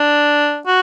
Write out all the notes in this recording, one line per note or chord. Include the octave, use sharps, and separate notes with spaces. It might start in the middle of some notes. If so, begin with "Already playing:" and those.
Already playing: D4
F#4